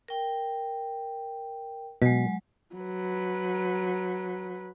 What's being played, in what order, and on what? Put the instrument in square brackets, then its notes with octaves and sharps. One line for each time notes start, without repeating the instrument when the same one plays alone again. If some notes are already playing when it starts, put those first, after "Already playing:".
[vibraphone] A#4 G5
[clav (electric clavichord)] B2 [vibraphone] F#3 G#3
[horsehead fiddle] F#3 B4